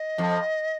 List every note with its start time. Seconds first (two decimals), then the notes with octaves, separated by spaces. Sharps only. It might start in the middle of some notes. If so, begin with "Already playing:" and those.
Already playing: D#5
0.18 F2 F3